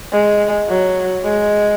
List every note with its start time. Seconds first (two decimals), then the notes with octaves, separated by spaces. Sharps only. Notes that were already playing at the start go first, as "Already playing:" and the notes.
0.12 G#3
0.68 F#3
1.25 G#3